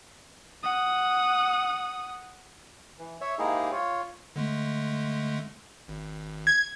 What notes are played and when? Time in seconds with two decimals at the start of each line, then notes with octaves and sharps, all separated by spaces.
0.63 F#5 D#6
2.99 E3
3.21 C#5 E5
3.39 G#2 A#3 D#4 E4 G4 G#4
3.72 F4 C#5
4.36 D3 G#3 A3
5.88 G#1
6.47 G#6